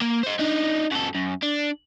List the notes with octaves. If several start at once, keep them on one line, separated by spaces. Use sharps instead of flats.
A#3
C5 D#5
D4 D#4
F#2 A4
F#2
D4